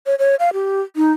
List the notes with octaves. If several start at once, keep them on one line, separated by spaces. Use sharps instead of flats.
C#5
C#5
F5
G4
D#4